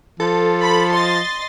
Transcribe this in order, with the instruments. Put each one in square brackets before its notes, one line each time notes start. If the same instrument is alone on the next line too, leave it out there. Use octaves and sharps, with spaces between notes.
[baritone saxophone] F3 [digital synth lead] A4
[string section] B5
D#5 C6 A6